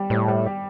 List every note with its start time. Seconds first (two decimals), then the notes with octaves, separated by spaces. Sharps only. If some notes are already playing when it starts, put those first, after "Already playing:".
Already playing: G3 G4
0.10 A2 G3
0.28 G3
0.46 G4